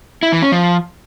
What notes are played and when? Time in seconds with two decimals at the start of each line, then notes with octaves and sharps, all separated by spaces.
0.23 E4
0.32 E3
0.42 C#4
0.52 F3